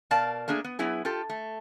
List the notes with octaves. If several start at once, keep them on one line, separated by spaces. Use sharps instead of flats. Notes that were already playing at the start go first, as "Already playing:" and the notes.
B2 A#4 D5 F5 A5
A3 A#3 D4 G#4
B3
F#3 B3 E4 G#4
F4 G4 A4
A3